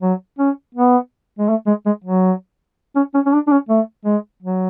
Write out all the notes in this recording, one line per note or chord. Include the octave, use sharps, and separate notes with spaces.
F#3
C#4
B3
G#3
A3
G#3
G#3
F#3
C#4
C#4
C#4
D4
D4
C#4
A3
G#3
F#3